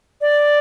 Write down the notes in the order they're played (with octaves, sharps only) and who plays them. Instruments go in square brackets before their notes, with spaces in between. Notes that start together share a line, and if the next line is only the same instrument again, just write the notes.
[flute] D5